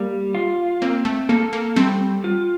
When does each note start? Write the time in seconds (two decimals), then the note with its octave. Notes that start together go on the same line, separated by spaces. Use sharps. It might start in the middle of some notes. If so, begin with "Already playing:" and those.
Already playing: G3 A#3
0.35 F4
0.82 A#3 C4
1.05 A3
1.29 A#3 A4
1.53 A#3
1.76 G3 A3 C4
2.24 F4